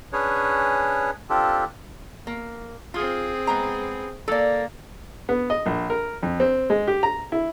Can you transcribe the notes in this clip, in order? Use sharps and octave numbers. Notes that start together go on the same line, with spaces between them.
C#4 D4 G#4 B4 C#5
C4 D4 F4 G4 A4
A#3
C4 F4 G#4
G#3 B3 A#5
A#3 A4 D5
B3
D#5
A#1
A#4
F2
C4
G#3
G4
A#5
E4